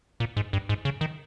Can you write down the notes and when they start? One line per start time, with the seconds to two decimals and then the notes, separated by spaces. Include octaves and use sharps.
0.20 A#2
0.37 G#2
0.53 G2
0.69 G#2
0.85 C#3
1.01 D#3